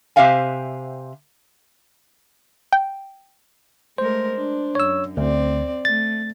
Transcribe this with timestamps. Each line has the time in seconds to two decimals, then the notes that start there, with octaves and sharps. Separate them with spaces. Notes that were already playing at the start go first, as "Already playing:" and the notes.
0.16 C3 G4 C5 E5 F5 G#5
2.72 G5
3.98 G#3 A3 A#4 C5
4.35 D4
4.75 F#2 C#5 E6
5.17 D2 C4 D5
5.85 A3 A6